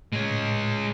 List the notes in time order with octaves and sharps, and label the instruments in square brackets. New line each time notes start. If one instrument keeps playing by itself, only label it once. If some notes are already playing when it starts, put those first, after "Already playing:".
[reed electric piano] A2 [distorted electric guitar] G#3 C#5